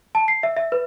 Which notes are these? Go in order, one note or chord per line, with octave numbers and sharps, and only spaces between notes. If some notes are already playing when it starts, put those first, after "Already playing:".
A5
C7
E5
E5
B4